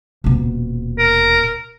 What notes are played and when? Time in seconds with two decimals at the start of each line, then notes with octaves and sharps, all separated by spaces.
0.24 D#1 B2
0.99 A#4